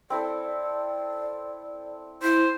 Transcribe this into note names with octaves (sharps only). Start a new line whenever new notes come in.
C4 E4 A4 D5
E4 C5